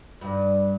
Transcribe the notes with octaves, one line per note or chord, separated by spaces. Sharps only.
G2